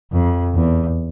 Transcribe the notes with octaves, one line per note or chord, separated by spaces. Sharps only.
F2
E2